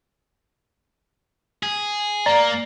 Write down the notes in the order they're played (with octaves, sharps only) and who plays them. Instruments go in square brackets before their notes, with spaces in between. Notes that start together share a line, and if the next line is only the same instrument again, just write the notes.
[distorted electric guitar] G#4
[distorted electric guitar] A#3 [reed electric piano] D5 A#5 A6